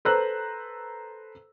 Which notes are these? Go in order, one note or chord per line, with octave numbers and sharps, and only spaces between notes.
A4 B4 C5 A#5 E6 F#6